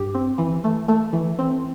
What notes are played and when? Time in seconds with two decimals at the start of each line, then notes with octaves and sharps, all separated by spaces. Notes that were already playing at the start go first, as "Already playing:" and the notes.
Already playing: G2 G4
0.15 C4
0.38 E3
0.64 A3
0.88 A3
1.13 E3
1.39 C4